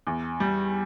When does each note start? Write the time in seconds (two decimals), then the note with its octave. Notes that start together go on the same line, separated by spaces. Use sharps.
0.07 E2
0.40 G3